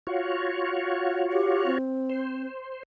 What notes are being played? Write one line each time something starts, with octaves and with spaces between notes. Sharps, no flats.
F4 F#4 C#5
G4
C4
C5